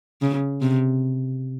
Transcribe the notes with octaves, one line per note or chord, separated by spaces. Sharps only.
C#3
C3